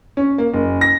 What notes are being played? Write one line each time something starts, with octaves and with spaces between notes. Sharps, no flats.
C#4
A#3
F#1
A#6